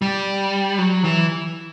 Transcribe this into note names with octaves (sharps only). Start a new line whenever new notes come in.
G3
F#3
E3